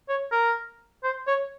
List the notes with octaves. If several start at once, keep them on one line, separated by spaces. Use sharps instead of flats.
C#5
A#4
C5
C#5